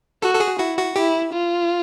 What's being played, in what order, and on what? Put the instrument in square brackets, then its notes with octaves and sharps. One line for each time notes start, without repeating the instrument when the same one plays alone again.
[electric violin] F#4 [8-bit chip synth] A4
[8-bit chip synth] A4
G#4
[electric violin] E4 [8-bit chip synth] F#4
[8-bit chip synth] F#4
[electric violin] E4 [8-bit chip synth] G4
[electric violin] F4